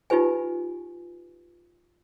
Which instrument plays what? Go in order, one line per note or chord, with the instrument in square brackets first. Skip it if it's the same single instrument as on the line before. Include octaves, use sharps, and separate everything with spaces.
[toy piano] D#4 F4 G4 B4 G#5